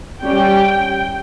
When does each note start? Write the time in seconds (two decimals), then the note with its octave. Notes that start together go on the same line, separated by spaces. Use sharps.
0.21 G3 C#4 G5